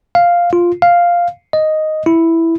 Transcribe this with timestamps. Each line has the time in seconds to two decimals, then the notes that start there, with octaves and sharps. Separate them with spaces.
0.15 F5
0.53 F4
0.82 F5
1.53 D#5
2.06 E4